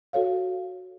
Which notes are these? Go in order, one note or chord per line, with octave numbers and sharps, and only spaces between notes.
F#4 A4 C#5 F5